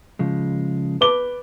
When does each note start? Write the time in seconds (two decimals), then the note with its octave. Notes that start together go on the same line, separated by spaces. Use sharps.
0.19 C#3 F3 G#3
1.01 B4 D6 G7